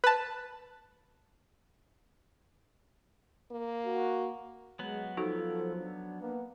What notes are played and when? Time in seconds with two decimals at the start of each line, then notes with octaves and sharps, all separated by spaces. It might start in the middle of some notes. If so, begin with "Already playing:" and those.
0.04 B4 A5
3.51 A#3
3.85 F#4
4.79 F#3 G#3 B3
5.17 F3 D#4 F#4 A4
5.79 D4
6.21 A#3 B3